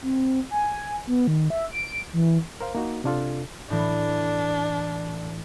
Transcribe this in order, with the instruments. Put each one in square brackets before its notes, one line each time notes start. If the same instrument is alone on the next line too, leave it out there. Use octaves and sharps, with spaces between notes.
[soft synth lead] C4
G#5
B3
D#3
E5
D7
E3
[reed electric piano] A#4 C5 F5
A#3 D#4 F#4
C3 D4 F4 A4
[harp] A2 E3 [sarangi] D4